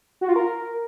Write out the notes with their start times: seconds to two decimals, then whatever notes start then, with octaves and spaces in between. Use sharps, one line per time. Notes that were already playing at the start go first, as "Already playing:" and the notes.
0.21 F#4
0.28 F4
0.36 A#4